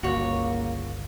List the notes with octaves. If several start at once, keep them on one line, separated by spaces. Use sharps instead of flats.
G1 C#2 A#3 F#4 C#5